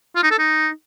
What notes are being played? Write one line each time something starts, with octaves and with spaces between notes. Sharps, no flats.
F4
D#4
A4
D#4